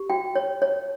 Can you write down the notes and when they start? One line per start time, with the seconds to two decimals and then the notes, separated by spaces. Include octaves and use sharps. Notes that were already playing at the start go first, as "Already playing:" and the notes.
Already playing: G4
0.10 F#4 G5
0.36 C#5
0.62 C#5